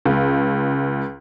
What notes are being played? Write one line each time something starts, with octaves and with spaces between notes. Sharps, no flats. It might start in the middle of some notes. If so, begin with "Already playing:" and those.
C#2